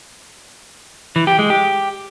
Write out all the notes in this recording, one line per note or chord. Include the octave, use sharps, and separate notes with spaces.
E3
G4
G#3
G4